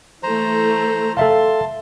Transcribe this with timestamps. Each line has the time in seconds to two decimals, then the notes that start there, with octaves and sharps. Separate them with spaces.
0.23 E3 A3 C5 A#5
1.17 A4 E5 F5 A5 C6